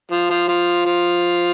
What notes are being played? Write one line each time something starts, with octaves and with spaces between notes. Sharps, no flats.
F3
F3
F3
F3